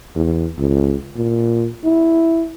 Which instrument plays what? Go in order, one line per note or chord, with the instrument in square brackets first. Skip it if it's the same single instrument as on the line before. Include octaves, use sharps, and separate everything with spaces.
[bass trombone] E2
C#2
A#2
E4